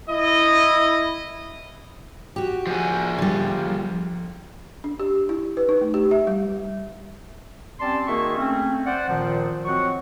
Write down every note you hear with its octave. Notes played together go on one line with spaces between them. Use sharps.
E4 D#5
F#4 G4
F3 G#4
D3 G3
D4
G4
E4
B4
D#4
A3
G4
E5
G3
G3 C4 C#4 D5 A5 C6
D#3 A#3 F#4 G#4 E5 C#6
A3 C4 C#4
C5 D5 F#5
A#2 D#3 F3
F#3 C4 D#5 F#5 C#6